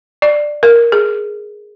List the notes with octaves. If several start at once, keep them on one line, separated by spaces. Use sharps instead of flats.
D5
A#4
G#4